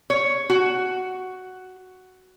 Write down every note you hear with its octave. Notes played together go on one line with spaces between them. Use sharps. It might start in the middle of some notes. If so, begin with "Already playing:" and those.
C#5
F#4